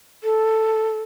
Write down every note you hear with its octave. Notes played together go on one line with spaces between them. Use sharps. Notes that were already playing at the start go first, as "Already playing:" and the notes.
A4